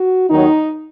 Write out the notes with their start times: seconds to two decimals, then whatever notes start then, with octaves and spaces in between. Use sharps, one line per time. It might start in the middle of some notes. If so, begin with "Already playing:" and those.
Already playing: F#4
0.29 D#2 D#3 F#3 D#4